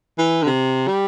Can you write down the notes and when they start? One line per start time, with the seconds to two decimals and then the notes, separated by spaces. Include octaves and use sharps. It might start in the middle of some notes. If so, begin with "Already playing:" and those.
0.18 E3
0.43 D3
0.46 C3
0.88 G3